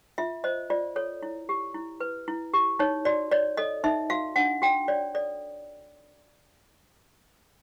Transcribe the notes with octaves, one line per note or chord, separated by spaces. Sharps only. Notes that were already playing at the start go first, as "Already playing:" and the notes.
F4 E5
C5 D#5
F4 D5
A4 C#5
E4
G4
E4
B4
E4
G4
D#4 C#5
F#4 D5
C#5 D5
A4 D#5
D#4 E5
F#4 F5
D4 F#5
F#4 G5
C#5 D5
A4 D5